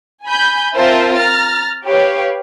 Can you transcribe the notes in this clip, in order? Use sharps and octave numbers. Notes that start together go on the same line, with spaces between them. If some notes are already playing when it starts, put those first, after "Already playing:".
G#5 B5 G6
C4 F4 A#4 C5 E5 A5
A#5 F6 A6
G4 B4 C#5 F5